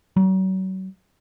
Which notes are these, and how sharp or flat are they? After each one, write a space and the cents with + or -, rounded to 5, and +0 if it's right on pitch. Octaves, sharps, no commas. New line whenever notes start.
F#3 +35